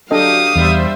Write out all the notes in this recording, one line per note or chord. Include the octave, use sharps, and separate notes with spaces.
F#3 D4 G4 A4 D#5 F5 D#6
E2 G3 C5 E5